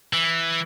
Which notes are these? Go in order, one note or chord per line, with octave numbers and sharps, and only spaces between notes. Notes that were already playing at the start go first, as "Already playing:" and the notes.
E3